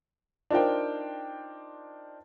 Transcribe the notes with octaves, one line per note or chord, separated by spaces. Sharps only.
D4 D#4 F4 A#4 C5 G5